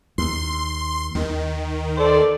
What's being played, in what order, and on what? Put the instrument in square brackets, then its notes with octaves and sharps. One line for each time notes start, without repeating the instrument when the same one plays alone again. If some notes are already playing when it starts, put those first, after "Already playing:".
[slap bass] D#2 [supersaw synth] C6
[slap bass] D#2 [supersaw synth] D#3
[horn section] A4 C5 D5